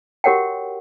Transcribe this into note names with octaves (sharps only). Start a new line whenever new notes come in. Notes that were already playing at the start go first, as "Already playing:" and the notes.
F#4 G4 A#4 C#5 F#5 G5